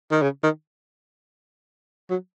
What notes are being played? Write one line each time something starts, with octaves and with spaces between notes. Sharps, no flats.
D#3
C#3
D#3
F#3